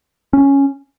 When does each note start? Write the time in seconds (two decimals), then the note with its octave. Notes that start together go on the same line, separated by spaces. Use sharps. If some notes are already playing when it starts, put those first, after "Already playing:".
0.33 C#4